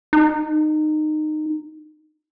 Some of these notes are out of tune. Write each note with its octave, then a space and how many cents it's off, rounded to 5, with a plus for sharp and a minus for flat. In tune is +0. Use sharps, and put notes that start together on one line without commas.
D#4 -20